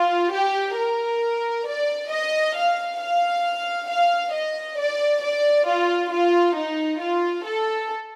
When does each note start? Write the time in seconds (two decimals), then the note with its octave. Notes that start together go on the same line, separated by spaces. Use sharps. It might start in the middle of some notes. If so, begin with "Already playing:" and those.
Already playing: F4
0.33 G4
0.77 A#4
1.66 D5
2.11 D#5
2.56 F5
3.00 F5
3.89 F5
4.33 D#5
4.78 D5
5.22 D5
5.67 F4
6.12 F4
6.56 D#4
7.00 F4
7.45 A4